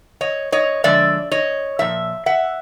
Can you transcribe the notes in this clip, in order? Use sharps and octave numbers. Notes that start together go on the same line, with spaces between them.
C#5 D#5
C#5 D#5
D3 F3 G#3 D5 E5
C#5 D#5
A#2 F3 E5
E5 F#5